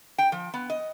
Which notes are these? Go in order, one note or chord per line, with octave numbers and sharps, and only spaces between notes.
G5
F3
B3
D#5